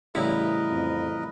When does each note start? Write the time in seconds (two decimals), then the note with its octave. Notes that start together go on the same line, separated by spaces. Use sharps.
0.15 A1 C#3 G3 E4 A#4 B4 D#5
0.70 F2